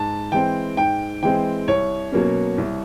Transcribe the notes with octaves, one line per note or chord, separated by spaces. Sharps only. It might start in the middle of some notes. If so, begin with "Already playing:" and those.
Already playing: G#2 A5
E3 G#3 C4 G5
G#2 G5
E3 G#3 C4 G5
C2 C#5
B2 F#3 A#3 C#4
C2